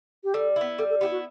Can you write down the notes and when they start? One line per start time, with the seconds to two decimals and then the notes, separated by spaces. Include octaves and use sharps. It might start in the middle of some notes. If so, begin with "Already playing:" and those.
0.24 G4
0.34 G3 A4
0.56 B3 E4
0.78 G3 A4
0.90 A4
1.01 B3 E4 G4
1.11 F#4